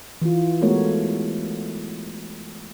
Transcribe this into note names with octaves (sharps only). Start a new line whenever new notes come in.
E3 F4
G#3 A3 B3 F#4 A#4 C#5